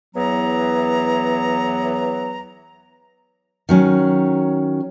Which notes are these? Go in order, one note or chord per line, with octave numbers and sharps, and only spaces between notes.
E2 E3 F#3 B3 A#5
D#3 F#3 C#4